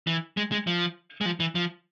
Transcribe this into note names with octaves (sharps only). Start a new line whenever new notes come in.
E3
G#3
G#3
F3
G#3
F3
E3
F3